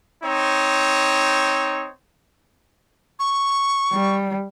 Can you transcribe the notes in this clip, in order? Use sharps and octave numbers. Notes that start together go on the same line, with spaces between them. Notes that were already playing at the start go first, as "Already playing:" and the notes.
C4 D#4 C#5
C#6
G3